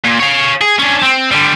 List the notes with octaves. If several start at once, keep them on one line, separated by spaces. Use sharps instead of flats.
A#2
C#5 F5
G#4
C#4 D4
C4
D3 G3